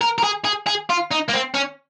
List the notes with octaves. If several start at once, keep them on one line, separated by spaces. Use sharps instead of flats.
A#4
A#4
G#4
G#4
G#4
F4
D#4
A#3
C4
C#4